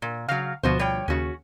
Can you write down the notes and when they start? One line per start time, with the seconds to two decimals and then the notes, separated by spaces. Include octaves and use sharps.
0.02 A#2
0.28 C#3 F#3 F5
0.63 D2 B2 F3 B3 F#4 C5
0.79 G3 C#5 G5
1.08 D#2 C#3 C#4 F#4